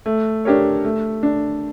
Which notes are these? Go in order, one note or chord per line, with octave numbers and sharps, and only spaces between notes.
A3
D4 G4 A#4 C#5
A3
D4